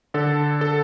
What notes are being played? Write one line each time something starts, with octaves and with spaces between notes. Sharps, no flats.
D3 A4
A4